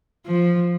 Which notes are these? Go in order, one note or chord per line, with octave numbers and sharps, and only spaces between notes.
F3